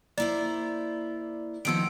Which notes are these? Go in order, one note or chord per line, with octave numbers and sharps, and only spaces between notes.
A#3 E4 C5 D5
D#3 F3 A#3 B3 D7